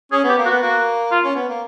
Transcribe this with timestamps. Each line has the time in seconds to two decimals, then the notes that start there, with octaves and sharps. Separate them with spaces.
0.12 C#4 G#4
0.24 B3 G4
0.38 A#3
0.45 F#4
0.50 B3
0.62 A#3 F#4
1.11 F4
1.23 C#4
1.36 B3
1.48 A#3